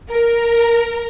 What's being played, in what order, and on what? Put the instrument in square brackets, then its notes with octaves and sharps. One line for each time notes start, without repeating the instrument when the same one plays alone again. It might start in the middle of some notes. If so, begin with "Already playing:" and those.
[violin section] A#4